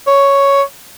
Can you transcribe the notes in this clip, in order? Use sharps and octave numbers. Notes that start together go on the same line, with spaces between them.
C#5